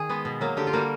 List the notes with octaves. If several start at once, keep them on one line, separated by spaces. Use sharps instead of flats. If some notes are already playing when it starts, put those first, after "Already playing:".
Already playing: D#3 G#4
G#3 B3
B2
F#3 A#3
D3 G4
F4
G3 A#3 F#4